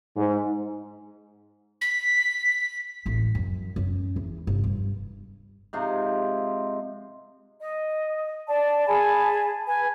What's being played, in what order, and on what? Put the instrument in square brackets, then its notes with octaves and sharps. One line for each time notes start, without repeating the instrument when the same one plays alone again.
[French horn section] G#2
[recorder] B6
[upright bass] D1 A1
F#2
F#2 C#4
E2
G1 C3
G2
[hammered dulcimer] G#2 C3 F3
[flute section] D#5
D5 A5
G#4 G#5 A5 B5
B4 G#5